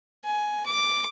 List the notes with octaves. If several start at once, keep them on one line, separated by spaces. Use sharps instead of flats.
G#5
D6